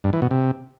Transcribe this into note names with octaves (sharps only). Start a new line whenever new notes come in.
G2
E3
B2
C3